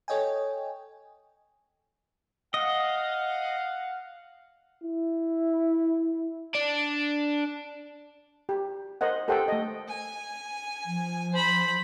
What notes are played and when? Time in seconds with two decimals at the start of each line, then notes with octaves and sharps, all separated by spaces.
0.08 A4 C#5 D#5 G5 G#5
2.54 D#5 F5 F#5
4.84 E4
6.55 D4
8.49 G4
9.01 A#4 C5 D#5 F#5
9.28 G4 A4 A#4 C5 F#5 G5
9.48 A3 D#5
9.88 G#5
10.86 F3
11.33 C5 B5